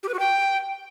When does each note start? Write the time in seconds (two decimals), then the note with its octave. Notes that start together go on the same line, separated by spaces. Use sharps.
0.03 G4
0.08 B4
0.14 F#4
0.19 G5